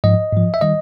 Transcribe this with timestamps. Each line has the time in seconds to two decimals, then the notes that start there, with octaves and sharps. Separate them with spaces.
0.04 G#2 F3 D#5
0.33 G#2 F3
0.54 E5
0.61 D#3 G3 D#5